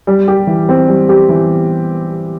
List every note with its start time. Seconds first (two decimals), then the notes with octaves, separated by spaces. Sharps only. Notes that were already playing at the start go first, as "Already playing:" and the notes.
0.07 G3
0.28 G4
0.47 E3
0.69 C4
0.88 G3
1.09 G4
1.29 E3